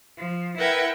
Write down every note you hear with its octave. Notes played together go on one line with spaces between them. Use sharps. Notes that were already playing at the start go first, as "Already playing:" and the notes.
F3
E4 A#4 B4 F#5 G5 G#6